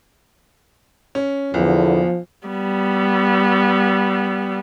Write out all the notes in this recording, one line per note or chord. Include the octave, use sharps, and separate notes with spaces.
C#4
B1 E2 D3 F3
G3 B3